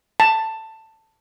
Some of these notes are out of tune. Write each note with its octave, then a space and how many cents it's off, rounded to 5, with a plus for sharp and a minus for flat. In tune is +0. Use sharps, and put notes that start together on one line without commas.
A5 +10